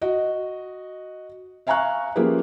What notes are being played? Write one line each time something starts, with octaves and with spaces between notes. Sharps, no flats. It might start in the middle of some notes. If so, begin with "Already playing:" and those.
F#4 D#5
E5 F5 G#5 A#5 C#6 F#6
F3 A#3 C#4 G4 G#4 B4